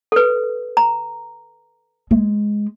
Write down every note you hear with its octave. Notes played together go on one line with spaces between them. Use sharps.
A4 B4
A#5
G#3